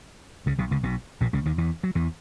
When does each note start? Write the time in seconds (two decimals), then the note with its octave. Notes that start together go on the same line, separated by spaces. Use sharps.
0.46 C#2 C#3
0.58 B1 B2
0.71 C#2 C#3
0.83 B1 B2
1.21 A#1 A#2
1.33 C#2 C#3
1.46 D#2 D#3
1.58 E2 E3
1.83 F#3
1.95 E2 E3